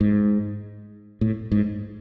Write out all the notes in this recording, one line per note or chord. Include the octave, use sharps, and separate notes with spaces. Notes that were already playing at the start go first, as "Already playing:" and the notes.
G#2
A2
G#2